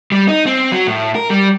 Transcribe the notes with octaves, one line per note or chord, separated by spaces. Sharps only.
G3
D#4
C4
F#3
A2
A#4
G3